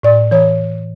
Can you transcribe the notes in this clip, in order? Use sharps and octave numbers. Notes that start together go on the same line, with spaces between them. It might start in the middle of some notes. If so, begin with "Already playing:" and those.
A2 D5
E3 C#5